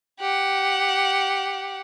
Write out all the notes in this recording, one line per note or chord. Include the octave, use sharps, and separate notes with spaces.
G4 F#5